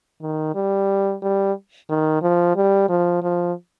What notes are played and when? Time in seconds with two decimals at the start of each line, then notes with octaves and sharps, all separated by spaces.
0.22 D#3
0.55 G3
1.22 G3
1.89 D#3
2.22 F3
2.56 G3
2.89 F3
3.22 F3